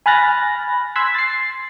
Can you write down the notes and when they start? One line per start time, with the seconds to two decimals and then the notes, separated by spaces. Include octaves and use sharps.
0.06 G#5 B5 F6 F#6 A6 A#6
0.96 C6 E6 F#6 G#6 B6
1.14 A6 C7